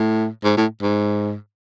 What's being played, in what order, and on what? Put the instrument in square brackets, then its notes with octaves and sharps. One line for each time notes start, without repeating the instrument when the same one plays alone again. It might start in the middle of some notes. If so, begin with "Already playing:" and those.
Already playing: [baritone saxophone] A2
G#2
A2
G#2